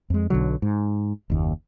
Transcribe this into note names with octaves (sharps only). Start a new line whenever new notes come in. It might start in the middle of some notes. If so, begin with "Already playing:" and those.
F2 G#3
B1 B2 D3 F#3
G#2
F#1 D#2